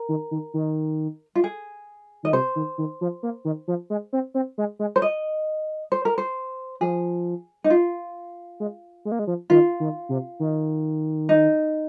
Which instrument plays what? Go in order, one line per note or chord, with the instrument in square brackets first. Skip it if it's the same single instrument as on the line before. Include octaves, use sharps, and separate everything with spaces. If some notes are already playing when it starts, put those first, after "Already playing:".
Already playing: [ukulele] A#4
[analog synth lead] D#3
D#3
D#3
[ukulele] F4
G#4
[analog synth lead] D#3 [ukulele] D#5
[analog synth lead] C3 [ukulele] C5
[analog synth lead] D#3
D#3
F3
A#3
D#3
F3
G#3
C4
C4
G#3
G#3
[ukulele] C5
D#5
C5
A#4
C5
[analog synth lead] F3 [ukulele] G#4
[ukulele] D#4
F4
[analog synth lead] G#3
G#3
A#3
G#3
F3
[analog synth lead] D#3 [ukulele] F4
[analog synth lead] D#3
C3
D#3
[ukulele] D#4